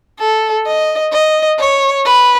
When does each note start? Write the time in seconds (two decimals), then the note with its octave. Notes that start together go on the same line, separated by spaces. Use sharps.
0.19 A4
0.66 D#5
1.13 D#5
1.59 C#5
2.06 B4